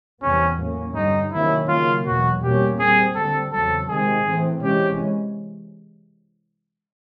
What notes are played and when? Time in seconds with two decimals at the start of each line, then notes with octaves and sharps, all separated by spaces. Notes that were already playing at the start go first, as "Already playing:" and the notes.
0.22 E2 C3 E3 G3 B3 C#4
0.59 A2 F#3 A#3 C#4
0.95 G2 D3 G3 D#4
1.32 C3 D#3 F#3 A#3 C#4 E4
1.68 C#3 F#3 A#3 F4
2.05 E2 B2 F#3 F#4
2.42 B2 G3 A#3 C#4 G4
2.79 A#2 G3 C4 G#4
3.16 D3 G3 C4 A4
3.52 E2 C#3 F#3 A4
3.89 C3 D#3 G#3 C4 G#4
4.25 A2 E3 A3 C4
4.62 C3 E3 G#3 C#4 G4